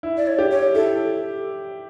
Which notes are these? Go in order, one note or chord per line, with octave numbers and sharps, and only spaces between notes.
E4
D5
C#5
G4
C#5
E4 A4